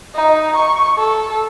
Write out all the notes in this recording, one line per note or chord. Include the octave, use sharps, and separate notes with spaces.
D#4
C#6
A4